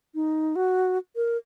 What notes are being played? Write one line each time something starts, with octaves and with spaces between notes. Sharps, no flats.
D#4
F#4
A#4